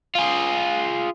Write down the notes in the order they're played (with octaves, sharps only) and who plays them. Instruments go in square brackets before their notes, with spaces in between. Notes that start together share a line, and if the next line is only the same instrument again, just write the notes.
[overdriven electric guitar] F4 G#4